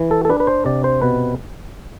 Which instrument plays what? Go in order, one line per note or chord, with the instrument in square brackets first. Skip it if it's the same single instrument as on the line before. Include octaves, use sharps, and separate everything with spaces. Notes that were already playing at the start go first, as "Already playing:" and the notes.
Already playing: [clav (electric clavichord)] E3
A4
A4
D4 B4
B4
C5
C3 D5
C5
B2 B4